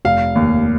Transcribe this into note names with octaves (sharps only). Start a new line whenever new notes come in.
F1 F5
D#2